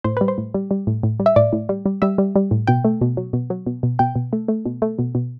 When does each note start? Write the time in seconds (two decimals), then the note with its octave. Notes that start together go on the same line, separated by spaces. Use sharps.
0.04 A2 C5
0.17 G3 B4
0.28 C5
0.38 A2
0.54 G3
0.71 G3
0.87 A2
1.03 A2
1.20 G3
1.26 E5
1.36 A2 D5
1.53 A2
1.69 G3
1.85 G3
2.02 G3 E5
2.18 G3
2.36 G3
2.51 A2
2.67 B2 G5
2.85 A3
3.01 B2
3.17 F#3
3.33 B2
3.50 F#3
3.66 B2
3.83 B2
3.99 B2 G5
4.15 B2
4.33 A3
4.48 A3
4.66 B2
4.82 A3
4.99 B2
5.15 B2